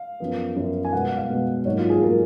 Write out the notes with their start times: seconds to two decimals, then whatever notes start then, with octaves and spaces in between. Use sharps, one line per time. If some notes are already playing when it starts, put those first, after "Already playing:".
Already playing: F5
0.20 F#2 F3 B3
0.56 F#2 F3 B3
0.84 G#5
0.93 B2 G#3 B3 F#5
1.05 F#5
1.17 F5
1.29 B2 G#3 B3
1.65 G#2 F#3 A#3 C#5
1.78 F4
1.90 G#4
2.02 F#3 A#3 A#4